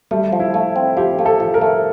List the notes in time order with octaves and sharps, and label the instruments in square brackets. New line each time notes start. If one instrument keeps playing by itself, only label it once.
[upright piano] G3 [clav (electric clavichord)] A3
[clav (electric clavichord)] F3
[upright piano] E4
[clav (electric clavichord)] A3
C4
[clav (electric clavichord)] F3 [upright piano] G4
[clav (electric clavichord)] A3
[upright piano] A4
[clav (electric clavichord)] F3
[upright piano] A#4
[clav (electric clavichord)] A3